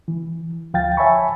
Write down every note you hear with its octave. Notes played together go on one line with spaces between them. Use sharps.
E3
D2 F3 F5 G5 A6
C#5 E5 G#5 A5 B5 C#6